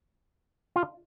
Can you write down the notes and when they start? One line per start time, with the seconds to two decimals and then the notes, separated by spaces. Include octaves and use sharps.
0.76 F4